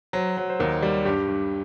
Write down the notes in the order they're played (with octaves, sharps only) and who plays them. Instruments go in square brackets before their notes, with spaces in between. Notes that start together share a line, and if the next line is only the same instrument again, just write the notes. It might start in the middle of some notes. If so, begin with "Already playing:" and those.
[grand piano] F#3 [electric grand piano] C5
[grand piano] F#3
[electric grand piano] C5
[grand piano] D#2 [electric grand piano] A#4
[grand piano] G3 [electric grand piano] D5
[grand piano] G2 [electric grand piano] G4
[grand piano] G2